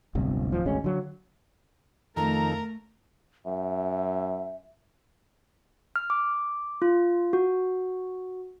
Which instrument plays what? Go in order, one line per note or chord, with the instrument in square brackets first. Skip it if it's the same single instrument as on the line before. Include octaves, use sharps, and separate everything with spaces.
[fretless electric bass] D1 G1 C3
D1 F3
G#1 D2 G#3 C#4
D3 F#3
[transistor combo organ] F2 D#3 A4 [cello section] A3 [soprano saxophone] A#4 [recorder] A#5
[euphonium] F#2 [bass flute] E5
[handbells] F6
D6
F4
F#4